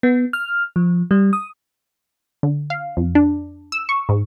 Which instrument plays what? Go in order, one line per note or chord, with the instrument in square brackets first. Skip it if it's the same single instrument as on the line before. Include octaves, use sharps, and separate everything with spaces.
[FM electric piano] B3
F6
F3
G3
D#6
[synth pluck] D3
F5
F2
D4
E6
C#6
G#2